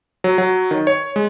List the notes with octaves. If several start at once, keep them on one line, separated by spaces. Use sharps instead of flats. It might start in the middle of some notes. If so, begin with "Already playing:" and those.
F#3
F#3
D#3
C#5
G#3